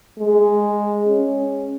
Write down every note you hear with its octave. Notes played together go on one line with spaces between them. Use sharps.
G#3
C#4